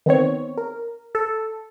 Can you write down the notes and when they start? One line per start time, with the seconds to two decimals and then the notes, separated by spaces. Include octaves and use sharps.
0.06 D#3 B3 C4 C#5
0.57 A#4
1.15 A4